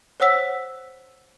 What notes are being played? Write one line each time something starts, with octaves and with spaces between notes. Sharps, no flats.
C5 C#5 F#5 E6 B6